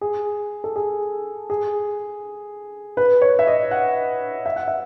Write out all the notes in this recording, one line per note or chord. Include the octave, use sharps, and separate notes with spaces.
G#4
A4
G#4
G#4
B4
C#5
E5
D#5
F#5
E5
F#5
E5